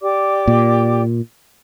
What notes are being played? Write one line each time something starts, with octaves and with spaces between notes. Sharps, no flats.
G4 D5 D6
A#2